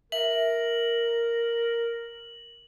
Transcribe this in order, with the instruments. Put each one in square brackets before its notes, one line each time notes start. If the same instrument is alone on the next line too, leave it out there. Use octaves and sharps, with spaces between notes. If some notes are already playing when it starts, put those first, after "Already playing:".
[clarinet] A#4 [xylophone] E5 [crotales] F#7